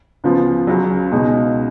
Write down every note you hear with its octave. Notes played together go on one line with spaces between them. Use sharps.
C#2 C#3 F3 B3 F4
C#2 C#3 F#3
C#2 B2 G#3 D#4